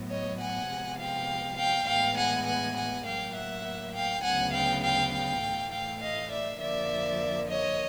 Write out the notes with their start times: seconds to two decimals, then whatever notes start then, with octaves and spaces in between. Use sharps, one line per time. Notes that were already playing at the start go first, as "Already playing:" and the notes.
Already playing: A2 F#3 B3
0.09 C#5 D#5
0.39 F#5 G#5
0.68 C3 F3 G#3 B3
0.99 F5 G5
1.57 F5 G5
1.86 A2 E3 G#3 B3 F5 G5
2.16 F#5 G#5
2.46 F#5 G#5
2.75 F#5 G#5
3.05 A2 F#3 A#3 F5 G5
3.34 E5 F#5
3.93 F5 G5
4.23 D2 C#3 F#3 B3 F#5 G#5
4.52 F5 G5
4.82 F5 G5
5.12 F5 G5
5.41 A2 E3 A3
5.71 F5 G5
6.01 D#5 F5
6.30 D5 E5
6.59 F2 D3 F3 A#3 D5 E5
7.48 C#5 D#5